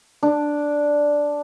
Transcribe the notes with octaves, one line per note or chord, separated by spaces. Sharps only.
D4